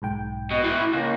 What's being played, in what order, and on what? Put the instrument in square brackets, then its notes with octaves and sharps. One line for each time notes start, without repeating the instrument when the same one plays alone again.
[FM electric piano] B1 G#2 G5
[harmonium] G2 D#5 [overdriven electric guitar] B2
[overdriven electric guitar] A2 E3 [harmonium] E4
[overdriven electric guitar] C#2 [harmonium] A#3 C#4 [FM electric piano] F#6 A#6